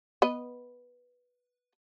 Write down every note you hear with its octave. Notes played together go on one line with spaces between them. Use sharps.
B3 B4 D#5